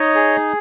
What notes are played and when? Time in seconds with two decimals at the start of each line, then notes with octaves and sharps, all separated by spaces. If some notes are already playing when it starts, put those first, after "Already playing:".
Already playing: D#4 C#5 D#5
0.15 G#4